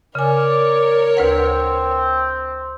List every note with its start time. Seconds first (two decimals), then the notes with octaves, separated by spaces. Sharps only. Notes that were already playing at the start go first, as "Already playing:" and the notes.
0.15 C#3 A#4 C#5 D5 G#5
1.17 D2 C4 B4 F#5